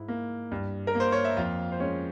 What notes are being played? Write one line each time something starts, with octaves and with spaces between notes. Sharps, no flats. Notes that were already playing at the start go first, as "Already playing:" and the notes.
Already playing: G#2 E4
A#3
G2
A#4
A#3
C5
C#5
E5
F2 F4 F5
C5
G#3 C#4 C#5